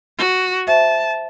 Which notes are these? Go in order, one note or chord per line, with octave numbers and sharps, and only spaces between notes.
F#4
C5 E5 A5